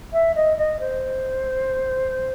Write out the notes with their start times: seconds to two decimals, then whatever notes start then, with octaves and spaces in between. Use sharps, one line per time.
0.13 E5
0.35 D#5
0.57 D#5
0.79 C5